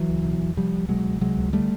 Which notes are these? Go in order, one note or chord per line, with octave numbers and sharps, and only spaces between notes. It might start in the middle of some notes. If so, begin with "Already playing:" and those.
Already playing: E3 F#3
C#2
B2
E2
C3 F3 G3
C2
B2 F#3 G#3
C#2
C3 F#3 G#3
C#2
D3 G3 A3